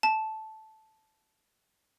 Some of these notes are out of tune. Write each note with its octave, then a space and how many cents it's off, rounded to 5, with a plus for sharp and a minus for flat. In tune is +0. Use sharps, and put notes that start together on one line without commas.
A5 -10